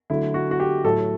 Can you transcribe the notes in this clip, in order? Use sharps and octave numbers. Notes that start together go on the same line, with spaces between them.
D3 F#3 A3 E4
F#4
F#4
G4
A2 F#3 A3 A4